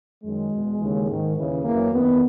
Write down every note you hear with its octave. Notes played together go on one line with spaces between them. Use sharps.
F#2 D#3 G#3
E2 B2
D#2 C#3 E3
G#2 D#3
D#2 C#3 E3
F#2 E3 A#3
E2 D#3 B3